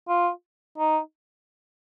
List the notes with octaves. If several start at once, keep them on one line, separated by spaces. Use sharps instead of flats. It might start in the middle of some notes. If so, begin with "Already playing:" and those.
F4
D#4